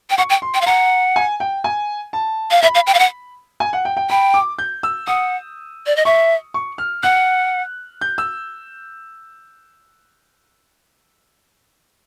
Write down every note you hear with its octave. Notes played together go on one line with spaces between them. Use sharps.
G5
F#5 C#6
G5
C6
G5
F5
F#5 A#5
G#5
G5
G#5
A5
F5
E5 B5
F5
G5
F5
F#5
G#5
F#5
G5
G5
G5 B5
D6
G6
E6
F#5 D#6
D5
D#5
E5 C#6
C#6
F6
F#5 F#6
G6
E6